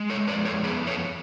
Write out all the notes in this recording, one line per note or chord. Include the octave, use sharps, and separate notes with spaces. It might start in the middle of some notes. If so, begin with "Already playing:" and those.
Already playing: G#3
A4 C#5
F2 B4 D5
A4 C#5
B3 G#4 B4
A4 C#5